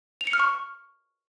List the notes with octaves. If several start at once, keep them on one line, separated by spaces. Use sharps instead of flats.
F7
C#7
F6
C#6